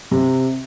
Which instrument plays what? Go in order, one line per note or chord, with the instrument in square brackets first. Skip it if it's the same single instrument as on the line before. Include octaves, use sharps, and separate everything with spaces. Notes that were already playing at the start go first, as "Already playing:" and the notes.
[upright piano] C3